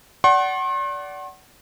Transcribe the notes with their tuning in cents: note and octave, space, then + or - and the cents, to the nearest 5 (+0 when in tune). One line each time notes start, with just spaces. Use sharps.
D5 -20 F#5 +25 C6 +45